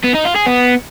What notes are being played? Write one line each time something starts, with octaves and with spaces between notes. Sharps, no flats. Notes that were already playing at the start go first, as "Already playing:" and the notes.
B3
D#4
F4
G#4
B3